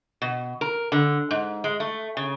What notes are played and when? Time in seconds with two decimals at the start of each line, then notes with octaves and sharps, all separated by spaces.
0.22 B2
0.61 A#4
0.92 D3
1.31 G#2
1.64 G#3
1.80 A3
2.17 C#3